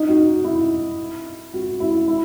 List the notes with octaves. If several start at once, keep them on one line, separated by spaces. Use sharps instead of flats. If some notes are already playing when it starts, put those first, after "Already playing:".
Already playing: D#4
F#4
E4
F#4
E4
E4